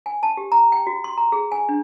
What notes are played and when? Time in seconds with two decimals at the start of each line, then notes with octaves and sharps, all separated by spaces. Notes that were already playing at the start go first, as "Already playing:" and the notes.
0.06 G#5
0.23 A5
0.37 G4
0.52 A#5
0.72 G5
0.87 F#4
1.04 C6
1.17 A#5
1.32 G#4
1.52 G#5
1.69 D4